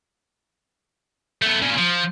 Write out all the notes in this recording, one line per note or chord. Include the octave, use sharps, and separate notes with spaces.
A3 B3
A#2 C#3
F3